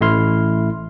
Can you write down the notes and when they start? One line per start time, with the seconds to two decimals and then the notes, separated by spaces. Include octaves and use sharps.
0.01 A1 A3 E4 C6 F6